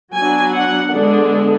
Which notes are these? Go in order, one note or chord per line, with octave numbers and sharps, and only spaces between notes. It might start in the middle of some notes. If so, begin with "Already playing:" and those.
F#3 B3 D4 G#5
F#5
D3 G#3 B3 D4